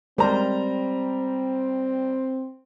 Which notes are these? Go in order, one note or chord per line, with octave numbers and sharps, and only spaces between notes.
G3 G#3 C4 A#4 C5 A#5